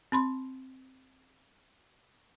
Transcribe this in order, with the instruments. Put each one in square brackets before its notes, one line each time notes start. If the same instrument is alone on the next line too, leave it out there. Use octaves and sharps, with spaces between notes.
[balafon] C4 B5 C6